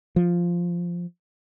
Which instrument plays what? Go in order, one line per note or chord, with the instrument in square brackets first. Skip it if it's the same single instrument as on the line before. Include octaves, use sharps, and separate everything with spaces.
[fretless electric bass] F3